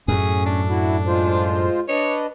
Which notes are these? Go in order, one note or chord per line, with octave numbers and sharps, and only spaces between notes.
F#2 A2 C#4 G#4
D4
E4 F#4
G#3 F4 C5
D4 B4 C#5 D#5